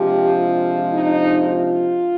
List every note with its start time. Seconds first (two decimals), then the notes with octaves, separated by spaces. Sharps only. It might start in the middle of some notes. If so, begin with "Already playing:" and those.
Already playing: C3 F3 G#3 D4 G4
0.37 F4
0.92 D#4
1.47 F4